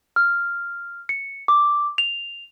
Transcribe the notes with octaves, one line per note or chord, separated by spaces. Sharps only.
F6
C#7
D6
F7